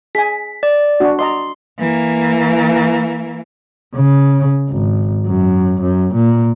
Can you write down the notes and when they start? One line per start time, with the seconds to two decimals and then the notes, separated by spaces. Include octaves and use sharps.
0.15 G#4 G#5 B6
0.63 D5
1.00 D4 F#4
1.19 D5 D#5 A#5 C6
1.79 E3 A#3
3.95 C#3
4.69 G#1
5.27 F#2
5.82 F#2
6.15 A#2